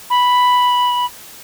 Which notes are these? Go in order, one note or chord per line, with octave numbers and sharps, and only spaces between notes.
B5